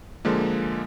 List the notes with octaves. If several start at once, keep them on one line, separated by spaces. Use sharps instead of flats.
D3 F3 G#3 A#3